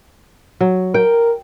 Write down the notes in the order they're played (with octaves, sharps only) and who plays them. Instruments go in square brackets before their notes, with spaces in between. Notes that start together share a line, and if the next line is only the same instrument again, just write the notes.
[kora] F#3
[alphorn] A#4 [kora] G5